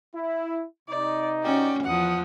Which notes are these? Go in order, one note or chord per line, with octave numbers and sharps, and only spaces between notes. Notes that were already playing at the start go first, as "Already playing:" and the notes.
E4
C3 D#4 D5
C#4 F#4 D5 G5
E2 F3 F#5 D#6